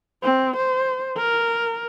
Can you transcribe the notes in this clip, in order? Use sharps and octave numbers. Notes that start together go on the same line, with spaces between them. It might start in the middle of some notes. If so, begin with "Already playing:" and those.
C4
C5
A#4